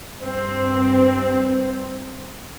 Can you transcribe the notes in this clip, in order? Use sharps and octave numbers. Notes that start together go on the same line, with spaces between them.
G2 C4